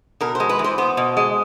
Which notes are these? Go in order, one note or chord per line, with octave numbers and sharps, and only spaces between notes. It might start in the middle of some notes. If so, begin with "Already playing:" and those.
B2 A#4
G#3 C5
B4
E2
C5
B3 C5
B2
G#3